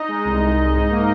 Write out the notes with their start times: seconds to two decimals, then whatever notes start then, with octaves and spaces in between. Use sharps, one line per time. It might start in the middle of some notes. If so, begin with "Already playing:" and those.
Already playing: D#4 D#5
0.09 G#3
0.25 C2
0.42 C2
0.58 G#3
0.75 G#2
0.91 A#3